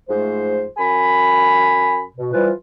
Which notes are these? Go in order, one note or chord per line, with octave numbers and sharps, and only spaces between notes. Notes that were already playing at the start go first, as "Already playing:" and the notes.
G#2 F3 A3 C5
F#2 G#5 B5
B2
E3 F3 G3 F4 B4